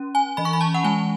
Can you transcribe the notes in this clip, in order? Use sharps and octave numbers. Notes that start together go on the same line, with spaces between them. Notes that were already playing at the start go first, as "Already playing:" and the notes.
Already playing: C#4
G#5
E3 B5
C#6
B5
A5
F#5
G#3 G#5